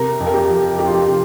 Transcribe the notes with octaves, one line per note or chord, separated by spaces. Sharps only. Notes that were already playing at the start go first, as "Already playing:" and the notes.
Already playing: C3 A#4
F2
A#4
G4
F3
F2 G4
F4
G4
C3